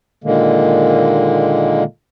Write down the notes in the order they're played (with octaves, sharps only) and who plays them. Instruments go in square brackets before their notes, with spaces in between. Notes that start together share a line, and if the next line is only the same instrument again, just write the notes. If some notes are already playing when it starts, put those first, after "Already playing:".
[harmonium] A#2 D3 D#3 G#3 A#3